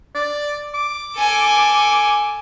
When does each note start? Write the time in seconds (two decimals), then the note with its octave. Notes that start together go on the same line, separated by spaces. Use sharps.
0.15 D5
0.74 D6
1.16 A4 G#5